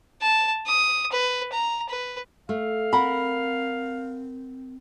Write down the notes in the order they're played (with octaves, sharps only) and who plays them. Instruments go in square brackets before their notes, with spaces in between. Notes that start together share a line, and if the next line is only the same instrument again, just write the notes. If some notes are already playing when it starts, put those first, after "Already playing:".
[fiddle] A5
D#6
B4
A#5
B4
[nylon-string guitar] A3 [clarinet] F5
[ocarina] C4 [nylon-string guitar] A#4 F#5 [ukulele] B5